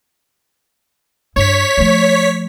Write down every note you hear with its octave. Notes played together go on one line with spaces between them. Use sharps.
G2 E4 C#5 B6
F3 A3